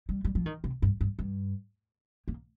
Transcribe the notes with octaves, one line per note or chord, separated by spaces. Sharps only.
G3
G3
F3
D#3
C3
G2
G2
G2
A#3